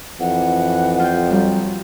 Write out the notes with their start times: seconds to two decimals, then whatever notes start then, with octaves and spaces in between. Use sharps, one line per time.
0.20 F2 E3 F#5
1.00 F4 G5
1.30 F#3 G3